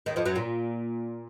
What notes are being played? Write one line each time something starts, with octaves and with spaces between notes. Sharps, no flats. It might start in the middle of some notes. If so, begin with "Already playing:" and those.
D#2 D#3
F2 F3
F#2 F#3
A#2 A#3